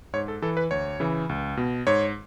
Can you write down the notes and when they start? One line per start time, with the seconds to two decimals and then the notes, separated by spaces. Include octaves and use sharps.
0.13 G#2 C#5
0.28 A4
0.42 E3 A4
0.57 B4
0.71 D2 C#5
1.00 C#3 E3
1.29 C#2
1.57 B2
1.87 G#2 C#5